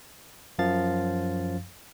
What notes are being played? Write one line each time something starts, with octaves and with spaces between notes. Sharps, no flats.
F#2 F3 F5 A6